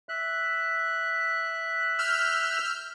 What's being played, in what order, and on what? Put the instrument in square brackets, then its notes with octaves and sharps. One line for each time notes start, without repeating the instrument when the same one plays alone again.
[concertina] E5 F#6
[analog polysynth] E6 F6 G6